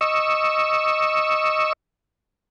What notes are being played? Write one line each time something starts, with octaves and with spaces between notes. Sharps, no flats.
D#5 C#6 E6